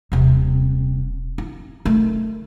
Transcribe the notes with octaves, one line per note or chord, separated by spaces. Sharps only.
D#1 C3
E4
D#3 A3